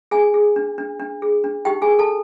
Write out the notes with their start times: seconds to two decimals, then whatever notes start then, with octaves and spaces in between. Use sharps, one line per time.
0.11 D4 G#4 G#5
0.34 G#4
0.56 D4
0.78 D4
1.00 D4
1.22 G#4
1.44 D4
1.65 D#4 G4 G5
1.82 G#4 G#5
1.88 A#4
1.99 A4 A5